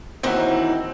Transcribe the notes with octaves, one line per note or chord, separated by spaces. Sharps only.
D#2 E3 C4 D#4 F#4